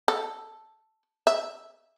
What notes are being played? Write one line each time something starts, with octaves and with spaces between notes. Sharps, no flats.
A4
E5